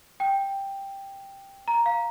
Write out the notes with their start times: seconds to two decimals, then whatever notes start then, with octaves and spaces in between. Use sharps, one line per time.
0.20 G5
1.68 A#5
1.86 F5